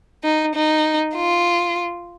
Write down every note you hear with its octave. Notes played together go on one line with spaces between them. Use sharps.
D#4
D#4
F4